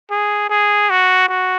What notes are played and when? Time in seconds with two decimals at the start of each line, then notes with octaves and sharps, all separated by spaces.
0.10 G#4
0.49 G#4
0.90 F#4
1.29 F#4